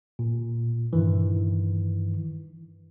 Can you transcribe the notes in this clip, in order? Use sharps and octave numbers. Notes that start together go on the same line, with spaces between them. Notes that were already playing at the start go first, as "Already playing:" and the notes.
A#2
G2 D#3 E3